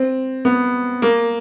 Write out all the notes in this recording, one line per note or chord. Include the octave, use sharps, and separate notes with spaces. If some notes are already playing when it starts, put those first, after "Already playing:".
Already playing: C4
B3
A#3